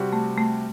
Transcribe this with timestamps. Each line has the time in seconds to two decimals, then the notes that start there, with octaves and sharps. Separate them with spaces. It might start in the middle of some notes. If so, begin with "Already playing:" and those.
Already playing: C3 G3 C4 F#4
0.13 A3
0.38 A3